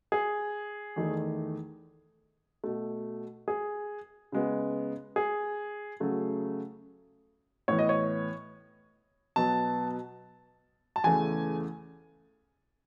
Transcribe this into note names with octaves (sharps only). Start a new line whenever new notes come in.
G#4
E2 D#3 A3
B2 A3
G#4
C#3 G#3 B3
G#4
C#3 F#3 A3
A2 E3 B3 C#5
D#5
C#5
B2 F#3 B3 A5
A5
E2 C#3 E3 A3 G#5